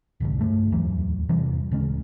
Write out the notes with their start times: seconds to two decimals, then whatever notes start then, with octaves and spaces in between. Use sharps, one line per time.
0.20 E1 C2 G#2 D3
0.41 G2 A3
0.72 D1 E2 E3 F#3
1.29 E2 C3 E3 G3
1.71 D1 C#3 G#3 C#4